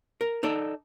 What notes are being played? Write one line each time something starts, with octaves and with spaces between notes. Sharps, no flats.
A#4
D#4 A4 D5